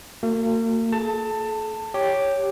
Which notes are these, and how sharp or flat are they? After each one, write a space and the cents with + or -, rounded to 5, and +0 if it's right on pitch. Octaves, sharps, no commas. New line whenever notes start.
A#3 -40 F#4 -5
A4 -45 A5 +20
G4 +0 C#5 +5